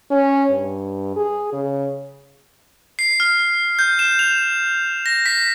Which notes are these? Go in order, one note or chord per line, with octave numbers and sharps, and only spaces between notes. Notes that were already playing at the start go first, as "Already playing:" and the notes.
C#4
G2
G#4
C#3
C7
F6
G6
E7
F7
A#6
B6